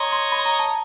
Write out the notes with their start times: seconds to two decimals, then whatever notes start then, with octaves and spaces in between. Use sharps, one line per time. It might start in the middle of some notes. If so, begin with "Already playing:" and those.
Already playing: C#5 D#5 A#5 C6
0.12 C6
0.32 B5
0.46 A#5
0.59 A5